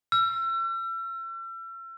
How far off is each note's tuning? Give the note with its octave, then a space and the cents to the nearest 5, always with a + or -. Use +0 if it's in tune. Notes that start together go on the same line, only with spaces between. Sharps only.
E6 +40